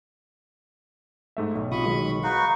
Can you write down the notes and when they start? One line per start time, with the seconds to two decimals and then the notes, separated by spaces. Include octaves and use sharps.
1.37 G#2 A3 E5
1.55 B1
1.72 C3 F4 B5 C#6 D#6
1.86 D#3 F#3 G#3
2.23 D#4 F#4 B4 F5 C#6